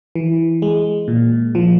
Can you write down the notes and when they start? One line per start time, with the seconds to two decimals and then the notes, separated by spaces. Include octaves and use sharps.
0.16 E3
0.62 G#3
1.08 A#2
1.55 F3